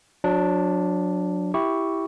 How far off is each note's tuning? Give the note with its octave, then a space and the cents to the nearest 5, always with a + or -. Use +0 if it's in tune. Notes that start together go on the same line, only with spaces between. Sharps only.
F#3 -30 D4 +0
E4 +0 G4 +0 C#6 +5